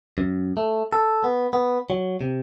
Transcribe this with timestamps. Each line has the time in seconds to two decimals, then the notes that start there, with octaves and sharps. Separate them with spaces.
0.18 F#2
0.57 A3
0.93 A4
1.24 B3
1.53 B3
1.90 F#3
2.21 C3